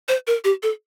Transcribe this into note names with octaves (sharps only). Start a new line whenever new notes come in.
C5
A#4
G4
A4